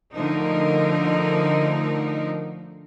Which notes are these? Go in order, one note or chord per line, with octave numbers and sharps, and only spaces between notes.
D3 F3 A3 D#4 A#4